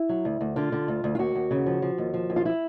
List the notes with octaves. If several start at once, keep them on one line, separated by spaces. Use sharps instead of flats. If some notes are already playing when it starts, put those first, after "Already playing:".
Already playing: E4
F#3
D2
D2
D3 F4
D3
D2
D2
F4
D#2 F#4
D#2
C#3
F3
F3
D#2
F3
D#2
F4
E4